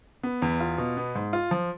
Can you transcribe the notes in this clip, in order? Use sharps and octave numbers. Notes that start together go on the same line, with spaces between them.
B3
E2
F4
B2
B3
G#2
F4
F3